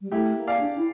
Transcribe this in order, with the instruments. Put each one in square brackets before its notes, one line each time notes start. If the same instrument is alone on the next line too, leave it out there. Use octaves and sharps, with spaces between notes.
[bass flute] G3
[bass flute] A3 [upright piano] E4 G4
[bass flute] A#3
[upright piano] D5 F5
[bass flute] D4
E4